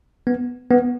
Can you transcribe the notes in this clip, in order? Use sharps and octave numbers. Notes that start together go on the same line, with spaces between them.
B3
B3